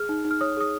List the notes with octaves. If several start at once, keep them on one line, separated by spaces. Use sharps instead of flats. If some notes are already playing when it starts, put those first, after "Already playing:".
Already playing: G#4 F6
D#4
D#4
F6
C#5 D#6
G#4 D#6